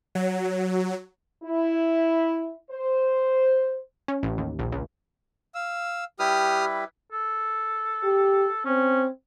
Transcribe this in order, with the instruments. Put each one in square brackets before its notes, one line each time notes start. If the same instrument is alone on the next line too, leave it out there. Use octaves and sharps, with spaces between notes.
[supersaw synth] F#3
[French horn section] E4
C5
[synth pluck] C#4
A1
D#2
A#1
C#2
[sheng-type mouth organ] F5 E6
[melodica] G3 E4 B4 [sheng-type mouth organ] G4 D#6 F6
[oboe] A4
[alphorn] G4
[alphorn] C4 [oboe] C#4